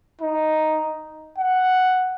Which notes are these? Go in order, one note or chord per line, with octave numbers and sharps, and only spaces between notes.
D#4
F#5